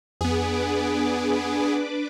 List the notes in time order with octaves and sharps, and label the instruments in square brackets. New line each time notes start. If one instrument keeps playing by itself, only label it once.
[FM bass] F2 [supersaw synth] B3 G#4 [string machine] D4 B4 D6